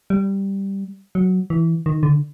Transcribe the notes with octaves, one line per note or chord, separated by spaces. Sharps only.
G3
F#3
E3
D#3
D3